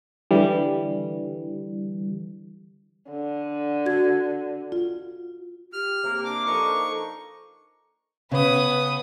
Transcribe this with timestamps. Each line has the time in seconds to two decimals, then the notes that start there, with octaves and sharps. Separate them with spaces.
0.31 D3 E3 G3
3.11 D3
3.86 F#4 G#6
4.72 F4
5.73 G4 F6
6.04 C3 A#3
6.25 D4 D6
6.46 F3 A#3 D#4 A4 C#6
8.31 C#3 B3 B4 D#6